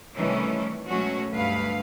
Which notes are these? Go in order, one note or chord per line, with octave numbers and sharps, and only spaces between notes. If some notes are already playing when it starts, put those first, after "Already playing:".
C3 D#3 E3 G3 A3 C#4
B2 F#3 G#3 A3 C#4 F#4
D2 G2 B4 F5